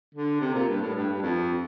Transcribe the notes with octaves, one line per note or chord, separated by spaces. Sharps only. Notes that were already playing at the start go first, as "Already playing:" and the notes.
D3
C3
A#2
G2
A2
G2
G2
F2